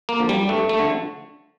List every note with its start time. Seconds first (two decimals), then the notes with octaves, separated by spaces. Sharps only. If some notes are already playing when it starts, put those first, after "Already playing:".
0.09 A#3
0.19 D3 F3
0.29 G3
0.49 G2 A3
0.69 A3
0.79 D3 F3